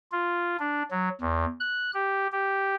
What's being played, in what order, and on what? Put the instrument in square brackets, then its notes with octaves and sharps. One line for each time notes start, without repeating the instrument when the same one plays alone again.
[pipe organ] F4
D4
F#3
E2
F#6
G4
G4